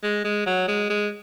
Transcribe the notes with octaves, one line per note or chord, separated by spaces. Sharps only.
G#3
G#3
F#3
G#3
G#3